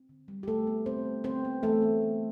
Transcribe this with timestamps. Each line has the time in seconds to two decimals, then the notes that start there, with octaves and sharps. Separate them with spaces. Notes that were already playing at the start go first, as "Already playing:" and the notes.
Already playing: C4
0.09 D3
0.28 G3
0.43 G4
0.48 D3 A3 A4
0.67 B3
0.86 D3 C4 C5
1.05 G3
1.24 D3 C4 C5
1.45 B3
1.63 E3 A3 A4
1.82 B3
2.02 B3